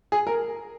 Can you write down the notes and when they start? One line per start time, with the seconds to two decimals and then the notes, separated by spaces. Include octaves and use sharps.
0.12 G#4
0.27 A#4